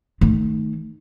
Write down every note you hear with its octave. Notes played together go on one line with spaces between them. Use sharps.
D#3 A3